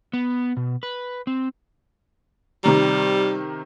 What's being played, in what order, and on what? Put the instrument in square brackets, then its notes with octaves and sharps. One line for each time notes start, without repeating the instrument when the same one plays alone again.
[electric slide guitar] B3
B2
B4
C4
[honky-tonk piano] C3 D#3 A#5 [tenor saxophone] G3